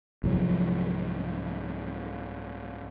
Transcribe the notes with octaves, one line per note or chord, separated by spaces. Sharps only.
C2 G#2 F3 F#3